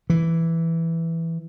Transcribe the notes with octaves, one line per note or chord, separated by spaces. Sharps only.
E3